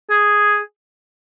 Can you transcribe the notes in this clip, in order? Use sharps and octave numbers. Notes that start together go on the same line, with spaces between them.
G#4